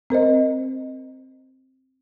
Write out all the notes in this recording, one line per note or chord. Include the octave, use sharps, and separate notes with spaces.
C4 A#4 C5 D#5